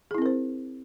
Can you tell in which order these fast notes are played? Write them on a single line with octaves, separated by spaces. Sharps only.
G#4 E4 C4 A#4 C5